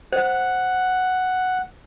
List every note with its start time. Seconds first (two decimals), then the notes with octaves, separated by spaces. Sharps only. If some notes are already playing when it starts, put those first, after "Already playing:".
0.13 C5 F#5